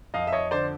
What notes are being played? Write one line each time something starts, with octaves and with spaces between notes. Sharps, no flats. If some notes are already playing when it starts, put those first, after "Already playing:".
F2 D#5 F5
E5
C#5 D#5
D3 C5 D5